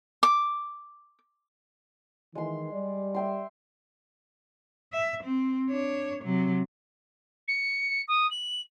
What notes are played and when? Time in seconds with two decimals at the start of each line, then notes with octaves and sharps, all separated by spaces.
0.23 D6
2.35 D#3 E3 G#3 C6
2.73 G3 D5
3.14 E5 G5 C6
4.93 E5
5.23 C4
5.70 D4 C#5
6.24 C3 F#3
7.48 C#7
8.08 D#6
8.31 F#7